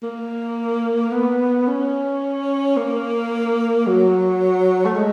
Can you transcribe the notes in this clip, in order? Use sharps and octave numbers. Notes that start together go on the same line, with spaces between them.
A#3
B3
C#4
A#3
F#3
A3
G#3